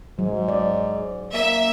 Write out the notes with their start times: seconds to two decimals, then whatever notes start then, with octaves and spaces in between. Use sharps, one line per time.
0.19 G#2 F#3
0.48 D5
1.33 A#3 E5